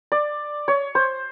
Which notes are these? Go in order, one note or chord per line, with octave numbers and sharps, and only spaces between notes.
D5
C#5
C5